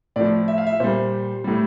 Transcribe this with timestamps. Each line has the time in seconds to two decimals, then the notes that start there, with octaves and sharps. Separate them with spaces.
0.16 A2 F3 D5
0.48 E5
0.58 F5
0.67 E5
0.80 A#2 G3 C5
1.44 A2 G3